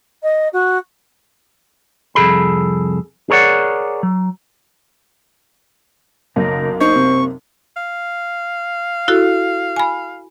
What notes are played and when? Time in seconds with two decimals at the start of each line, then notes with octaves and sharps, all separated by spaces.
0.23 D#5
0.53 F#4
2.15 C2 F2 C#3 G#4 A4 B5
3.30 G#4 A#4 C#5 D5 F#5
4.03 F#3
6.36 B1 F#2 C#3 A#3 D#4 A#4
6.80 D#4 C5 C#6
6.94 C3
7.77 F5
9.08 E4 F#4 A4
9.76 G#5 B5